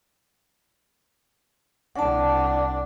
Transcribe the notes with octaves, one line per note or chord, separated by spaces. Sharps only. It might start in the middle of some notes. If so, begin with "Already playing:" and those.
C2 D4 F#5 A5